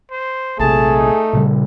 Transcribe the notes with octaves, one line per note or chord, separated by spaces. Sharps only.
C5
A#1 C3 A3 G#4 A5
D#4
A#2 C#3 G3